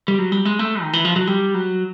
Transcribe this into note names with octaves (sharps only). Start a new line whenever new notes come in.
G3
F#3
G3
G#3
A3
D#3
E3
F3
F#3
G3
F#3